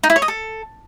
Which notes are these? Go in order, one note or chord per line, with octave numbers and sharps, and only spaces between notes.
D#4
E4
C#5
D#5
A4